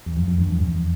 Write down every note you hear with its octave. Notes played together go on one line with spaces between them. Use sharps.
E2
F2
F2
E2 G2
F2
E2 G2